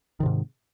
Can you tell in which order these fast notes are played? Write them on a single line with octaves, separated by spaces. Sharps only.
D#3 C3 G#2